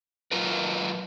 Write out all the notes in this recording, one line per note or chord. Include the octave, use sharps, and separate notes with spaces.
F#3 F4 A#4 B4